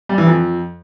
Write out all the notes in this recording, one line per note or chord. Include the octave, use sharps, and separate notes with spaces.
G3
E3
F2